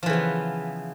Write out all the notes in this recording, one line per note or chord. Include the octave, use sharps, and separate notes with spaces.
C#3 E3 F3 B3